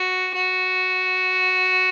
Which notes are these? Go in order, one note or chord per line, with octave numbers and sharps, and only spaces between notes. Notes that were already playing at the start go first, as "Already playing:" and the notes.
Already playing: F#4
F#4